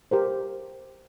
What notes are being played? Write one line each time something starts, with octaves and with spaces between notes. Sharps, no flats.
G4 A#4 C5